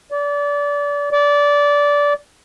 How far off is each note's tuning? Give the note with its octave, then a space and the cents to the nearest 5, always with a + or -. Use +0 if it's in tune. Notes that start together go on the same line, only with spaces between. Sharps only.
D5 -30
D5 -20